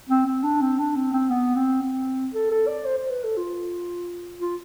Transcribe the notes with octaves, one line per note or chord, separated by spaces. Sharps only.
C4
C4
D4
C4
D4
C4
C4
B3
C4
C4
A4
A4
D5
C5
C5
B4
A4
F4
F4